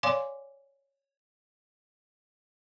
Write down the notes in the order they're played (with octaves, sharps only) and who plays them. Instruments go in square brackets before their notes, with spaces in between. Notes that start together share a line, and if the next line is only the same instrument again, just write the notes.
[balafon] C#5 D5 F5 G#5 C6 D6